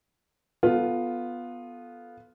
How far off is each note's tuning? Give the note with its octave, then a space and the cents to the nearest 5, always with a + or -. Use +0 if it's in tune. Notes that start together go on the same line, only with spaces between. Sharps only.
B3 +0 F4 +5 A4 +0